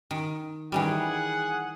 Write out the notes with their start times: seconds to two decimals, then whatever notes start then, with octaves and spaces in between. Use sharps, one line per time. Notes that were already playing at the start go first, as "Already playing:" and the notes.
0.11 D#3
0.72 D#3 E3 G3 G#4 F#5